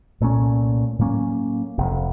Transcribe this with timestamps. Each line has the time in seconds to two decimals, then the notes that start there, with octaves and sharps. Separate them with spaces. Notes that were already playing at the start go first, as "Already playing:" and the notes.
0.20 C2 A#2 A3 C#4
0.99 A2 F#3 A#3 C#4
1.78 F1 F2 C3